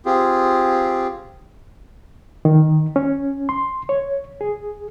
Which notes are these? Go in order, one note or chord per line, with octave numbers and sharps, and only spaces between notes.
C4 F4 G4 G#4
D#3
C#4
C6
C#5
G#4